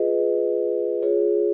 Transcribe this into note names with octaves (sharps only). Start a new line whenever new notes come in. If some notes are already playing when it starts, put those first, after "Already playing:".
Already playing: F4 G#4 B4 D#5
F4 G#4 C#5